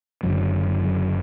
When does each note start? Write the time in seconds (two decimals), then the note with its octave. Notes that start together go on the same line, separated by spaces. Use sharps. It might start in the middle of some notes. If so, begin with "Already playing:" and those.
0.23 F#1 F#2 D3 F#3
0.85 F#3